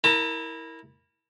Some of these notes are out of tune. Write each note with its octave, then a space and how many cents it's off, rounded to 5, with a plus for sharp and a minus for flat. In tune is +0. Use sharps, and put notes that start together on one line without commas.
E4 -20 A#4 +0 A5 +35